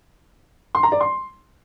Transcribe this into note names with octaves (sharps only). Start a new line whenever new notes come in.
C6
A#5
D5
C6